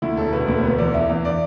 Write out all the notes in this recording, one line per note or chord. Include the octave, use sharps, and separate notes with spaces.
D2 E4
E1 A4
E1 B4
D2
B3 B4
E2 D5
E2 E5
E2
D5